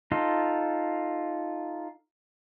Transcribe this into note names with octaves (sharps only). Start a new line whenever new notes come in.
D#4 F4 A4